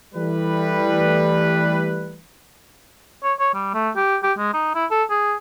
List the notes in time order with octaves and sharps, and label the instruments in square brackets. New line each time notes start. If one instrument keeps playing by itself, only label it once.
[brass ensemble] E3 G3 A3 B4
[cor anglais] C#5
C#5
G3
A3
G4
G4
G#3
D#4
E4
A4
G#4